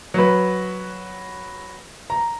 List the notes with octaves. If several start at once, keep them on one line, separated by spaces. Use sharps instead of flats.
F#3 B4
A#5